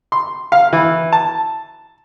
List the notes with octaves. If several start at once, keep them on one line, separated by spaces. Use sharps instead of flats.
C6
F5
E3
A5